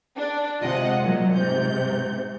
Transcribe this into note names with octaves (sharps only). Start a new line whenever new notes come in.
D4
C3 G#3 F4 D#5 F#5
A#2 F#3
G#2 C3 G6